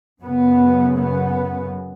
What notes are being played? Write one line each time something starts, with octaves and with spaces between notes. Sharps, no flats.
F#2 C#3 B3
B3